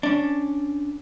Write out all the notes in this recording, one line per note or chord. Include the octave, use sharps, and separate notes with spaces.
C#4 D4